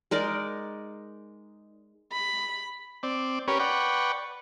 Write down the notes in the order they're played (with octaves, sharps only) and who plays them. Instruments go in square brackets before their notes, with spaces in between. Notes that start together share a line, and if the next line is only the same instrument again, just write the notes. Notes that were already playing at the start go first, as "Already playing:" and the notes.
[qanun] G#3 D#4 A#4 D5
[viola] B5
[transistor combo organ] C4 D5
C#4 G4 A#4 B4 C#5
B4 D5 F#5 G5 C#6